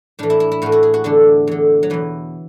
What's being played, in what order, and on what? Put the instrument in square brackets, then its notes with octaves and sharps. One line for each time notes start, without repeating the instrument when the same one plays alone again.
[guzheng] A2 E3 D4
E4
E4
E4
A2 E3 F#4
F#4
G#4
F#4
E2 D3 D4
E2 D3
F#3
E2 B2 E3